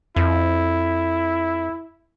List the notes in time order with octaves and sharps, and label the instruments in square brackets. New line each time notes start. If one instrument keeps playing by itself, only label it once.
[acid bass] F2 [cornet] E4